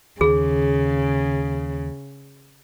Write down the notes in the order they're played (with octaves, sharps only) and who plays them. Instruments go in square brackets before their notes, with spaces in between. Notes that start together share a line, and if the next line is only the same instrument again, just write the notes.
[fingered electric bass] D#2 [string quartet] C#3 [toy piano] G#4